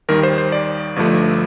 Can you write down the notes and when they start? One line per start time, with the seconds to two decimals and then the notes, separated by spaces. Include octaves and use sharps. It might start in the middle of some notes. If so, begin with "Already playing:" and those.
0.09 D#2 D#3 G3 A#4
0.23 C5
0.38 C5
0.52 D5
0.96 G1 G2 F3 A3